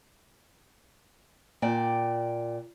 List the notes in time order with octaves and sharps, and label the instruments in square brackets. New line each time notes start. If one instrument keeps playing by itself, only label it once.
[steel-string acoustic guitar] A#2 D5 G5